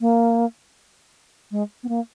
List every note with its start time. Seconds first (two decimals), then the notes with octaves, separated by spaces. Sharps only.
0.01 A#3
1.51 G#3
1.83 B3
1.89 A#3